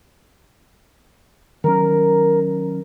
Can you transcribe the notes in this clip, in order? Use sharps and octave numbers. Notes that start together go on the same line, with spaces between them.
D#3 F#3 C#4 A#4